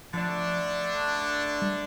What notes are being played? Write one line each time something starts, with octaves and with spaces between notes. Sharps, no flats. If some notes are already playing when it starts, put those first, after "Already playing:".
D3 F3 A3 D4
G3